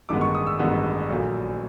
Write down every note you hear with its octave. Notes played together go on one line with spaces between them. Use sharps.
A1 G2 D#3 G#3 B3 D6
C#6
D#6
E6
A1 G2 D#3 G#3 B3
A#1 A#2 F#3 A3